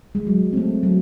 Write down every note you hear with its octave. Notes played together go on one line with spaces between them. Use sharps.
G#3
F#3
C4
A3
F#3